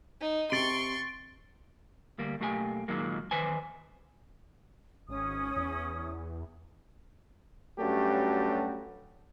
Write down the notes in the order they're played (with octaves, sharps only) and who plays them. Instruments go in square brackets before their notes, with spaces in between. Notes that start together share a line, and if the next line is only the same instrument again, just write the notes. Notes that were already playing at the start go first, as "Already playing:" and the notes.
[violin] D#4
[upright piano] C3 [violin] C6 C#6 [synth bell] A6 D7
[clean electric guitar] D2 G3 A#3
B1 A3 A#3 G4 F#5 G#5
A#2 D#3 F#3 G#3 A#3
E2 D#3 B4 C5 G#5
[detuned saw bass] G#1 [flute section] C#4 D#6
[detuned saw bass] E2
[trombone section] G2 F#3 A3 C#4 F#4 G4